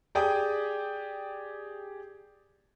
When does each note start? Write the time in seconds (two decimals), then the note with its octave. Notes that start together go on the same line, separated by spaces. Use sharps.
0.15 G4 G#4 D5 G5 D#6